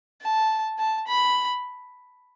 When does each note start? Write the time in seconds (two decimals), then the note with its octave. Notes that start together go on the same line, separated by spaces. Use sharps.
0.22 A5
0.79 A5
1.07 B5